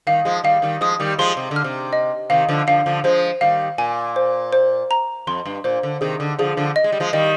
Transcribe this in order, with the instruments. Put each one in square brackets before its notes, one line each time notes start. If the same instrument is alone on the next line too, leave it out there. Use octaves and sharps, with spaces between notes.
[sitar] D#3 G3 [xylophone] F5
[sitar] F3 G#3
[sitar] D#3 G3 [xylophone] F5
[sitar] D#3 G3
[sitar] F3 G#3 [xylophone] D#6
[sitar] D#3 G3
[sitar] F3 G#3 [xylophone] C6
[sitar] C3
D3
[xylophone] F6
[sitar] C3
[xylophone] D#5
[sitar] C3 D#3 [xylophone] F5
[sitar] D3 F3
[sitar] D3 F3 [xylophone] F5
[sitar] D3 F3
[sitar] F3 G#3 [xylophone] C5
[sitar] D#3 G3 [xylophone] F5
[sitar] A#2 [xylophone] G#5
[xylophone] C5
C5
A#5
[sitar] F2 [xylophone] C6
[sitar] G2
[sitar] A#2 [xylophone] C5
[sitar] D3
[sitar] C3 D#3 [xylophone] G#4
[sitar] D3
[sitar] D3 F3 [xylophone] G#4
[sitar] D3 F3
[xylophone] D#5
[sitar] G#3
G3
F3 G#3
[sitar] D#3 G3 [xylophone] D#5